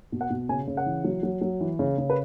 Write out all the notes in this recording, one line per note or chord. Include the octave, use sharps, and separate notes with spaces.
B2
F#5
B2
C#3 G#5
C#3
F#5
E3
F#3
F#3
F#3
E3
C#3
C#3
B4